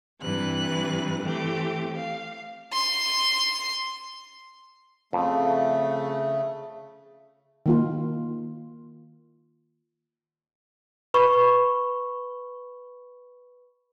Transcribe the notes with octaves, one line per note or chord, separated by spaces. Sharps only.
G2 C3 E3 B4 F#6
E3 A3 C4 G4
F5
C6
F2 C#3 A3
D#3 A#3 F4
B4 B5 C#6